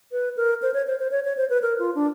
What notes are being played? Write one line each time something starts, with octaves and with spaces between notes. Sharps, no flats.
B4
A#4
C5
C#5
C5
C5
C#5
C#5
C5
B4
A#4
F4
D4